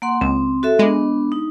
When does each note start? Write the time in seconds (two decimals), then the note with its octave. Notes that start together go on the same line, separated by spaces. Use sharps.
0.02 A#3 F#5 C6
0.21 C#2 C4
0.63 F#4 A4 E5
0.79 G#3 B3 D4
1.32 D#4